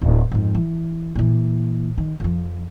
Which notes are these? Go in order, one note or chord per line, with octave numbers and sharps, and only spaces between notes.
D1
F2 G#2
E3
A#2 E3
D#3
F2 F3